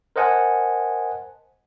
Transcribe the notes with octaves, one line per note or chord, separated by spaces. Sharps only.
A#4 C5 D#5 F#5 G#5 A5